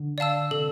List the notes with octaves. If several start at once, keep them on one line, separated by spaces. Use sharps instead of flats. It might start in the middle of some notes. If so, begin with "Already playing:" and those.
Already playing: D3
D5 F5 A5 E6
C3 A4